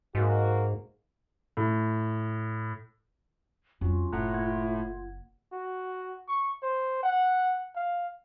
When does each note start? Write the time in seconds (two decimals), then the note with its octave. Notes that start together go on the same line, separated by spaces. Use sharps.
0.15 G#2 A#3 F#4
1.57 A2
3.81 F2 G3 C#4 F4 F#4
4.13 F#1 A2 F#5 A#5 F#6
4.34 A#3 F#5 G#6
5.52 F#4
6.28 C#6
6.63 C5
7.03 F#5
7.75 F5